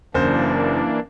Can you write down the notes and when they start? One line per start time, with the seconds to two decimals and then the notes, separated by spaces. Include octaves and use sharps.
0.14 F#1 E3 A#3 D4 C5